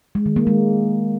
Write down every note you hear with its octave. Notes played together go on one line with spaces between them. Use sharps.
G#3
D#3
A#3
G#3